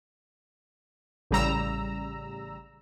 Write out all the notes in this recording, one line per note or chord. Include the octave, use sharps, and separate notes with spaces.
A1 C#3 G3 A#5 E6